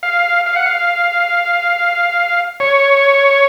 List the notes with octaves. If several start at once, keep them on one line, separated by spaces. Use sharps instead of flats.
F5
F5
F#5
F5
C#5